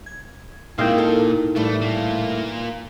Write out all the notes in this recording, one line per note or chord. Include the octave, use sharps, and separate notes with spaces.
G#6
A#2 G#3 C4 D#4 E4 A#4 F5 G5
A4
A2 E3 G3 A3
A#3 F4